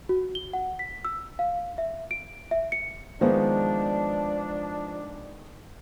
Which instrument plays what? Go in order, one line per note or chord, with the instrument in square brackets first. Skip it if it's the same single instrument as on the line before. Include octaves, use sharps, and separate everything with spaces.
[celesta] F#4
G7
F#5
B6
E6
F5
E5
D7
E5
C#7
[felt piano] D#3 G#3 B3 [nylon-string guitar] F3 [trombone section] D4